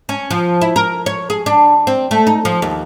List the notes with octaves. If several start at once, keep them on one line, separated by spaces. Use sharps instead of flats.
C#4
F3
E4
A#4
C#5
G#4
D4
C4
A3
D#4
F3
D#2